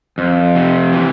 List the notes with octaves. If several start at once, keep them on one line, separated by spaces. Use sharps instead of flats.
F2
C3
E3